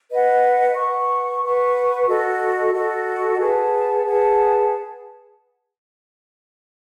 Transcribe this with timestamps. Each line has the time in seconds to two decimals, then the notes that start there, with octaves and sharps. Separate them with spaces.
0.09 B4 D#5 F#5
0.75 B4 F#5 C#6
1.42 B4 F#5 C#6
2.08 F#4 A4 D#5
2.74 F#4 A4 D#5
3.39 G#4 B4 F#5 A5
4.06 G#4 B4 F#5 A5